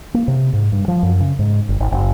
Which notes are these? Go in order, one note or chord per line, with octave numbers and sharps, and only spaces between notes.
A#3
C3
G#2
G2
F3
F#2
C#3
G#2
G1
G#1
F#1